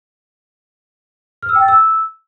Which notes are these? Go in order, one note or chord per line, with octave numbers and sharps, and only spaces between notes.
F6
E6
G5
A6
E6